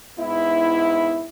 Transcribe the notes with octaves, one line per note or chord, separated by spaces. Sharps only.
G#2 B3 E4